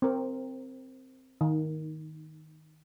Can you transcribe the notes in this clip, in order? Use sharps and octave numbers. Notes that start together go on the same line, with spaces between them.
C4 A#4
D#3